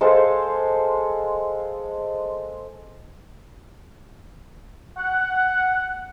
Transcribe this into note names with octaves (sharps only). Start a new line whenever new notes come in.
G#3 A4 C5 F5
F#5